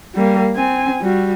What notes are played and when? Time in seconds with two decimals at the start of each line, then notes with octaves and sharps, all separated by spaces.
0.15 G3 A#3
0.56 C4 G#5
1.01 G3 F#4